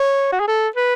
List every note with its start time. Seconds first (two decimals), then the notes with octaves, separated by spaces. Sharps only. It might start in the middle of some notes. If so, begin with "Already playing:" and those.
Already playing: C#5
0.32 F#4
0.40 G#4
0.47 A4
0.76 B4